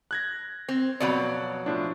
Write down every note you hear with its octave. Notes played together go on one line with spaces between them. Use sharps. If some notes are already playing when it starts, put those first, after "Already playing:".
F#6 G#6 A#6
C4
F2 B2 F#3 D5
A2 F3 D4